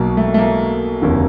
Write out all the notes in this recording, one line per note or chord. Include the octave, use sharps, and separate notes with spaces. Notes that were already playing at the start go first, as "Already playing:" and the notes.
Already playing: B1 B2 A#3
A3
A3
A#3
F1 D#2 D3